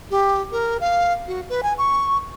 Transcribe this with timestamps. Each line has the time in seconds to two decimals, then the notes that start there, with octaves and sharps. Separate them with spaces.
0.11 G4
0.52 A#4
0.81 F5
1.27 F#4
1.49 B4
1.63 G#5
1.78 C#6